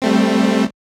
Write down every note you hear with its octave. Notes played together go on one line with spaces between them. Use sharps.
G3 A3 C4